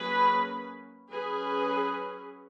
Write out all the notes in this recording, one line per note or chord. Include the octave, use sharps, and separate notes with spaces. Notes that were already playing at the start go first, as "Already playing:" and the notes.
Already playing: F#3 A#3 C#4 G#4 B4
F#3 C#4 G#4 B4